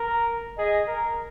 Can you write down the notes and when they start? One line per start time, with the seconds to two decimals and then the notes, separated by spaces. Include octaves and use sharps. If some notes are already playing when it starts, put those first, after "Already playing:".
Already playing: A#4
0.58 G#4 D#5
0.87 A#4